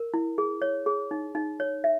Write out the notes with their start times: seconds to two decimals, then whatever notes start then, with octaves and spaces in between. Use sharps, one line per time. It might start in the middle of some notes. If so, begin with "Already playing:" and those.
Already playing: A#4
0.14 E4
0.38 G#4
0.62 C#5
0.86 G#4
1.11 D#4
1.35 D#4
1.60 C#5
1.84 E5